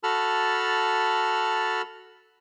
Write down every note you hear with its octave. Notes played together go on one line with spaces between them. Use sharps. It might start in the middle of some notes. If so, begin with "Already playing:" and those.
F#4 A4 A5 B5 F6